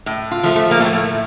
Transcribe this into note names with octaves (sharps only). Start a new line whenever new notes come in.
A2
F4
F3 A3
A3
A#3
A2 A3